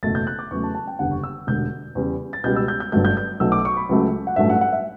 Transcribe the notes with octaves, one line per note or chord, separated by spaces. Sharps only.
F#1 E2 B2 A3 A6
G6
F#6
D6
E2 C#3 F#3 A3 C#6
A5
A5
G5
F#1 E2 D3 G3 F#5
C#6
E6
E1 D2 D3 G3 G6
E2 C#3 G3
A6
C#2 B2 G3 G6
E6
G6
G6
G1 G2 F#3 A3 G6
G6
G6
B1 B2 F#3 A3 E6
D6
C#6
B5
C#2 C#3 F#3 A3
F#5
A1 G2 F#3 A3 E5
F#5
F#5
E5